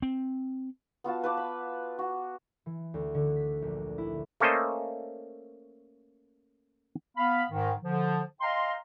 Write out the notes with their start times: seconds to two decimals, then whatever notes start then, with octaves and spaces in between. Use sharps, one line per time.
0.02 C4
1.04 B3 F4 F#4 A5
1.23 B4 A5 D6
1.37 B5
1.99 F#4
2.66 E3
2.94 D2
3.14 D3
3.36 B6
3.62 A#1
3.98 E4
4.40 A3 A#3 C#4 A4 C5 D#5
7.16 B3 F5 B5
7.50 G#2 D#3
7.82 D3 F3
8.41 D#5 F5 G5 A#5 C6